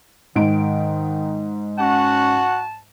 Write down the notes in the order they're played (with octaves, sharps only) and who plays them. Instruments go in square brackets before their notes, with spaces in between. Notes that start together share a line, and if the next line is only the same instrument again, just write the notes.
[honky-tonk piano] G#2 D7 [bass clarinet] D#3
[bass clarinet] C#4 [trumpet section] F#4 F#5 [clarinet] A5